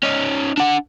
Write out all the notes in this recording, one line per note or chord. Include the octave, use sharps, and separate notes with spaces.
C#4 D#4
D4 F#5